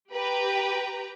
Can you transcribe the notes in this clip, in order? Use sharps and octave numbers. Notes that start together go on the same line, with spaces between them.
G4 B4 G5 A#5